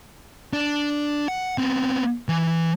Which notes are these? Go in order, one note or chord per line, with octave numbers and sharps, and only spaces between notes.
D4
F#5
B3 C4
E3